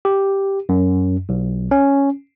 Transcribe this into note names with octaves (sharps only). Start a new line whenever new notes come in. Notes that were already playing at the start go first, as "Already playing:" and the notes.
G4
F#2
B1
C#4